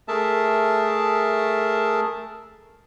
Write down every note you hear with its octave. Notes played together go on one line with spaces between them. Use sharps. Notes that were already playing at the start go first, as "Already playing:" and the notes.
A3 G#4 A#4 E5 A5